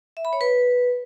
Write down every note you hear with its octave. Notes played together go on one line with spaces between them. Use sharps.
E5
B5
C#5
B4